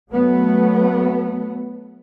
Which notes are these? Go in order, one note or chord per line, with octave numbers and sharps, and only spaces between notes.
F#3 A3 B3